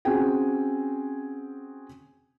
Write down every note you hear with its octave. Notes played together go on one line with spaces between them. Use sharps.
C4 C#4 F#4 G#4 G5 G#5